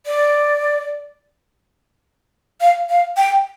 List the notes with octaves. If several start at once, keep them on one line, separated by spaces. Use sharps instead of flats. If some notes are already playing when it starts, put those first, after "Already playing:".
D5
F5
F5
G5